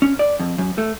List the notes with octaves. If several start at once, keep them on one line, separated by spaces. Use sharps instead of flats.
C#4
D5
F2
F#2
A3